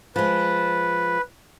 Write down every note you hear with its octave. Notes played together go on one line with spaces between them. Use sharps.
F3 G#3 B4